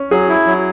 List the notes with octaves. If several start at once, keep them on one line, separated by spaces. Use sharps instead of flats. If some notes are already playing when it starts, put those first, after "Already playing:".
Already playing: C#4
F#3 G#4
E4
F#3